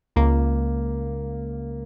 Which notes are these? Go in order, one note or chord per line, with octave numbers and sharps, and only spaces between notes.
C#2 A#3